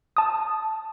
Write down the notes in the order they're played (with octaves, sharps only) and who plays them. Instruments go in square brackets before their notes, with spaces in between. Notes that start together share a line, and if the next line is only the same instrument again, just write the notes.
[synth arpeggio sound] A5 D#6